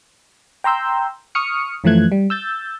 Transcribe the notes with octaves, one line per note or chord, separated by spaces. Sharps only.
G5 A#5 C6 E6 G6
C#6 D#6 F6 C#7
F#2 E3 F3 A3 F#6 G#6
G3
E6 G6 A6